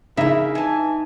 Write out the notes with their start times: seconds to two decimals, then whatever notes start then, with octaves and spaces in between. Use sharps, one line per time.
0.17 C#3 A#3 D#4 E4 E5
0.55 E3 G#5 A5